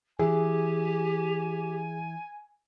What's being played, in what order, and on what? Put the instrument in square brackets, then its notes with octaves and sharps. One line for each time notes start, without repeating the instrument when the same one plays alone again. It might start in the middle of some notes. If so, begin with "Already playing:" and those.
[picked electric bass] E3 [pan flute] G4 [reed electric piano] G#4 [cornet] G#5